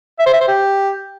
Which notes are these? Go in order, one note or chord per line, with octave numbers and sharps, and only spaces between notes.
E5
C5
E5
C5
G4